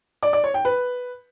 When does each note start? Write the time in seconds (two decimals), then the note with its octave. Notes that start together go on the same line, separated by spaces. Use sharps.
0.23 D5
0.33 D5
0.44 C#5
0.54 G5
0.65 B4